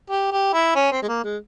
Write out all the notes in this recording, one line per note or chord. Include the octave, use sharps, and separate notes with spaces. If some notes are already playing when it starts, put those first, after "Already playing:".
G4
G4
E4
C#4
C4
G#3
A#3
G#3